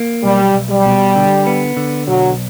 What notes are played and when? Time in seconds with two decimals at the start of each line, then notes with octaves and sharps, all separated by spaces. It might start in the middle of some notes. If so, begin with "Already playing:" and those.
Already playing: A#3
0.23 B1 G3
0.54 B1
0.70 G3
0.86 B2
1.15 D3
1.47 B3
1.77 D3
2.08 B1 F#3